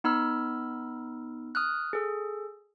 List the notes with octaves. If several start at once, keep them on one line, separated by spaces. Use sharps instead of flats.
B3 D#4 B5 E6 F6
D#6 F6 F#6
G#4 A4